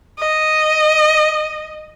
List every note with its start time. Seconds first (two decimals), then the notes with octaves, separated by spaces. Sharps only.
0.19 D#5